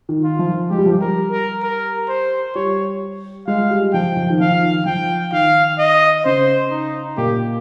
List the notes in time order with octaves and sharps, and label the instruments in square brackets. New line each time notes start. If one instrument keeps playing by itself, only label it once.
[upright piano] D#3
[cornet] F4
[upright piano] F3
[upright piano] G#3 [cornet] G4
[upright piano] G3
F3
G3
[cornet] A#4
A#4
A#4
C5
[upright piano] G3 [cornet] C#5
[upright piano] G#3 [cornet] F5
[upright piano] G3
[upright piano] F3 [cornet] G5
[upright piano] F3
D#3
[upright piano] F3 [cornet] F5
[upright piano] D#3
[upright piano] F3 [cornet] G5
[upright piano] D#3 [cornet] F5
[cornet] D#5
[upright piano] C#3 [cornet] C5
[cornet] D#4
[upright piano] A#2 [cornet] G4